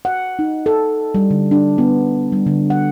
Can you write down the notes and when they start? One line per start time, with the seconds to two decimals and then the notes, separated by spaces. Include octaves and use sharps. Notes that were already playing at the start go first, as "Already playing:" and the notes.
0.05 F#5
0.39 D#4
0.66 A4
1.15 G3
1.31 D3
1.51 D4
1.78 B3
2.32 G3
2.46 D3
2.70 F#5